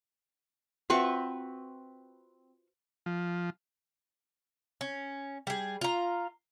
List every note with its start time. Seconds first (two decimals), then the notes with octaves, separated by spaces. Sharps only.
0.90 C4 F4 F#4 B4 E5 F#5 C#6
3.06 F3
4.81 C#4
5.47 G3 G#4
5.81 F4 A#5